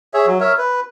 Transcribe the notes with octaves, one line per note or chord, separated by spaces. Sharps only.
G#4 C#5 E5
F#3
A#4 C#5 E5
B4